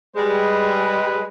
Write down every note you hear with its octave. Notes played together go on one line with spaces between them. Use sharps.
G3 G#3 B4